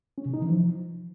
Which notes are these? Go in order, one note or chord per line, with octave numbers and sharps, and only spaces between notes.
C#4
C3
D#4
E3
F3